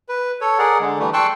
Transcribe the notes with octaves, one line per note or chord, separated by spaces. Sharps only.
B4
A4 C#5
G#4 A#4 D5 F#5
D3 G#3
E3 G3 A3
G5 A5 C6 C#6 E6 F#6